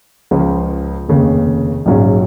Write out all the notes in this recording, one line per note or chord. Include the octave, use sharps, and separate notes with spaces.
C#2 C#3 F3
F1 D#2 C#3
A#1 G#2 F#3 C#4 F4